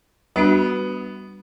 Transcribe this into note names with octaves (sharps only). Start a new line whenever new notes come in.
G3 B3 D4 F#4